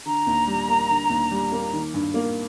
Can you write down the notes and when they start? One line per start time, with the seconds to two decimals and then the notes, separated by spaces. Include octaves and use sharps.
0.06 D3 A#5
0.26 D#2
0.47 G3
0.68 A#3
0.89 D3
1.10 D#2
1.31 G3
1.52 A#3
1.73 D#3
1.94 G2
2.14 A#3